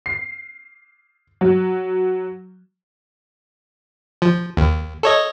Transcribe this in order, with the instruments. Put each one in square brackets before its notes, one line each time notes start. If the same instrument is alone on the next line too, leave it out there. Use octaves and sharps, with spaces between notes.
[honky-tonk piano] C7
F#3
[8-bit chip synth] F3
D#2
A4 C#5 D#5